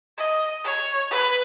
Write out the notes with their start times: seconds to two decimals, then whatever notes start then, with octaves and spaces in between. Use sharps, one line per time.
0.18 D#5
0.64 C#5
1.11 B4